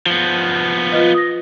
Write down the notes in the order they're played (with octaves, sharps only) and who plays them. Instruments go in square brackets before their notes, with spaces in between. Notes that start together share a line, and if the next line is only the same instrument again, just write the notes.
[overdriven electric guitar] F3 B3
[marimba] F4 B4 D#5
D#6 A#6